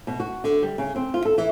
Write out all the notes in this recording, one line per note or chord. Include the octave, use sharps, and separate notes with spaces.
B2
F#4
D3
G3
C#3
C4
F4
A4
E3